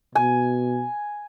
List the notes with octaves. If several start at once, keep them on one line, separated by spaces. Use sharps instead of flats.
B2 G#5